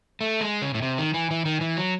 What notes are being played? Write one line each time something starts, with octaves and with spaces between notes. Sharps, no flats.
A3
G#3
C#3
A2
C3
D#3
E3
E3
D#3
E3
F#3